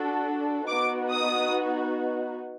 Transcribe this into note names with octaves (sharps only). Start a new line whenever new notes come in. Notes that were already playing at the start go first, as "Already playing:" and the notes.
Already playing: D4 F#4 A4
B3 D#4 F#4 D6
D#6